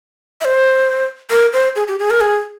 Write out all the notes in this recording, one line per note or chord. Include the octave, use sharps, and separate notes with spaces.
E5
C5
A#4
C5
G#4
G4
G#4
A#4
G#4